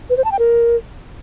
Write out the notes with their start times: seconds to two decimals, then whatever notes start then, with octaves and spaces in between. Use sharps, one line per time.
0.10 B4
0.17 C5
0.24 A5
0.32 G5
0.39 A#4